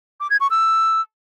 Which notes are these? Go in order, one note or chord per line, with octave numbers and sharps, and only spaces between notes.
D6
G#6
C#6
E6